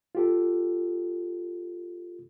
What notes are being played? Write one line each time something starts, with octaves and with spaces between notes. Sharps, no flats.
F4 G4 A4